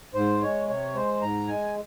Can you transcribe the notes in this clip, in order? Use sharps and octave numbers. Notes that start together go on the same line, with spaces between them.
G#2 C5
G#3 C#5
C3 C#5
G#3 C5
G#2 A#5
G#3 G#5